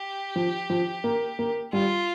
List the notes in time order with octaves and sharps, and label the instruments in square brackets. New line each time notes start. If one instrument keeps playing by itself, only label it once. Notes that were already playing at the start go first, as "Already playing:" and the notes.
Already playing: [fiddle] G4
[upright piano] F3
F3
A#3
A#3
[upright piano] G3 [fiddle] F4